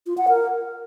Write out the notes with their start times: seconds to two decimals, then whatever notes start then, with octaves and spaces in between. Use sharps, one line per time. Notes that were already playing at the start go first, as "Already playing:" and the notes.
0.07 F4
0.18 F#5
0.29 A#4